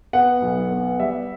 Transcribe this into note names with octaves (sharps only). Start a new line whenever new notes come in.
B3 F#5
B1
B3
G3 E5